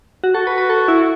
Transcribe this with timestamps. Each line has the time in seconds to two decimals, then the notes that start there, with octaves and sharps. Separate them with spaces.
0.24 F#4
0.34 F#4 A4
0.47 B4
0.58 B4
0.70 A4
0.88 E4